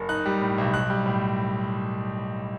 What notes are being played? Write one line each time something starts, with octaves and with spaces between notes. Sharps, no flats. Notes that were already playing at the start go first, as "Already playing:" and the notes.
Already playing: F#1
D#4 F#6
G3
A2
B1
B1 F#6
G3
A2